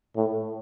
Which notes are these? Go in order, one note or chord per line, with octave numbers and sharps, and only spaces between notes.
A2